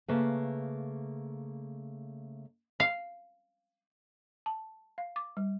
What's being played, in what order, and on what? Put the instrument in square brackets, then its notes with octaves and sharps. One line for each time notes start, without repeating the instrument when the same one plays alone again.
[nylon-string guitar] C#3 A3 A#3 B4 F5
[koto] F5
[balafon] A5
F5
D6
G3